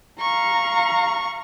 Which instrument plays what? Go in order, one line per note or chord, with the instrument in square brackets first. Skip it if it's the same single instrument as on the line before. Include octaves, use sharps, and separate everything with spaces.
[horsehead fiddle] F5 A#5 [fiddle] C#6